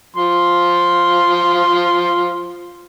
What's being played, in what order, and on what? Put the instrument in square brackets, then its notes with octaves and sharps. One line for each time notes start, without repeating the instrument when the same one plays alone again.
[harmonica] F3 C6